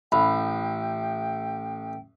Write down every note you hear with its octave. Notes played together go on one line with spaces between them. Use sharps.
A1 G5 B5